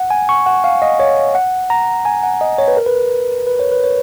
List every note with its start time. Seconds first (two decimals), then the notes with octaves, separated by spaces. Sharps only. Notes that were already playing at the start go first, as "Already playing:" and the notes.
Already playing: F#5
0.10 G#5
0.29 C#6
0.46 F#5
0.64 F5
0.82 D#5
1.00 C#5
1.35 F#5
1.70 A#5
2.05 G#5
2.23 F#5
2.41 D#5
2.58 C#5
2.68 B4
2.77 A#4
2.86 B4
3.47 B4
3.59 C#5
3.72 B4
3.84 C#5